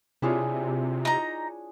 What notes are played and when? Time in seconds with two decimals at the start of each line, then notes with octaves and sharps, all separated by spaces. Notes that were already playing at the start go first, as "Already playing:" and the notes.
0.22 C3 D4 E4 F4 G#4 C#5
1.05 D#4 A#5